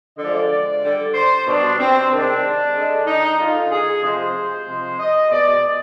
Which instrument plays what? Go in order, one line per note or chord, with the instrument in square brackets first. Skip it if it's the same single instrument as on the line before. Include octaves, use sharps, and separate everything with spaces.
[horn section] D3 F3 G#3 D5
D3 G3
C5
B2 G3 D4
C4
C3 D#3 G#3 D4
D3 G#3
D#4
D3 G#3 F4
G#4
C3 F3 G#3 C5
C3 F3 G#3
D#5
B2 G#3 D5